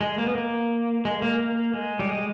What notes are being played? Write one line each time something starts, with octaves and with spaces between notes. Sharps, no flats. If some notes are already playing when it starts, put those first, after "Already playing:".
G#3
A#3
B3
A#3
G#3
A#3
A#3
G#3
G3
G#3